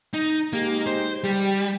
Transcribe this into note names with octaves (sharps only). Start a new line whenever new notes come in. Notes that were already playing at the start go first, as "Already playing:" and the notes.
D#4
G#3 A#3 D#4 G4
C5
G3 G4